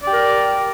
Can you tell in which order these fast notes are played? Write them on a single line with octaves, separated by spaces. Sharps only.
D5 G4 A#4